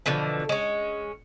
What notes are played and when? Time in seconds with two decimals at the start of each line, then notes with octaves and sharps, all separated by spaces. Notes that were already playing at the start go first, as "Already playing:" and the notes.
0.06 B2 D3 E3 F3
0.49 G#3 C#4